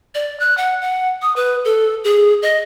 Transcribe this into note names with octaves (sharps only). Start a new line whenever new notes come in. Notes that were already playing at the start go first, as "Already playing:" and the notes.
D5
F#6
F#5
F#5
D#6
B4
A4
G#4
D#5